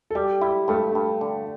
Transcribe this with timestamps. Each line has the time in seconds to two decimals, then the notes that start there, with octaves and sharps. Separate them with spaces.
0.11 A4
0.15 G3 G4
0.41 E4 G4
0.68 G2 A3
0.95 G2
1.21 D3